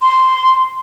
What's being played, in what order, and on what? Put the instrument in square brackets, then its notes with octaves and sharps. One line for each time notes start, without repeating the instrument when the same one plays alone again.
[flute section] C6